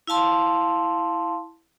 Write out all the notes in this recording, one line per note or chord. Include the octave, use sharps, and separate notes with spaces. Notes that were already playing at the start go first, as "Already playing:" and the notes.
E4 F5 A5 C6